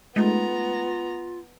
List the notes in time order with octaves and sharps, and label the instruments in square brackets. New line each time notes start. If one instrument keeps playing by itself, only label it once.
[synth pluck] G#3 A3 D#4 [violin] B3 A#5 [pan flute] F4